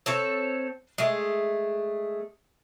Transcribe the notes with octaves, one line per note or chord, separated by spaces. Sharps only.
C4 A4 C#5
G#3 A3